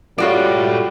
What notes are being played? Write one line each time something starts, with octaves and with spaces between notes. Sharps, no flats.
G3 F4 F#4 A4 C#5 D5